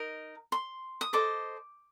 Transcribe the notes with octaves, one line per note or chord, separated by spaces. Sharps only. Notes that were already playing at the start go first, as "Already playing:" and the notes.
Already playing: D#4 A#4 D#5
C6
D#6
A4 C5 D#5 D6